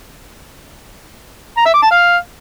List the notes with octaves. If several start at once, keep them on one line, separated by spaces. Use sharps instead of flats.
A#5
E5
D6
A5
F5